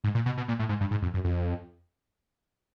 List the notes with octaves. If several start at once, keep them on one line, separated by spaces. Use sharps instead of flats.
G#2
A#2
B2
B2
A#2
A2
G#2
G2
G#2
F2
F#2
F2